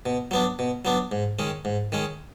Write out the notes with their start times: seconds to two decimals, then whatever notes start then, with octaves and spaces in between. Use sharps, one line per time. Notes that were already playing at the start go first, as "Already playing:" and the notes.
0.06 B2
0.31 F#3 B3 D4
0.59 B2
0.85 F#3 B3 D4
1.12 G#2
1.39 D#3 G#3 C#4
1.65 G#2
1.92 D#3 G#3 C#4